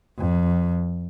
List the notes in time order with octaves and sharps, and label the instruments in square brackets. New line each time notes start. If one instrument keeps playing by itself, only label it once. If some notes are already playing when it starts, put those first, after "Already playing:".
[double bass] F2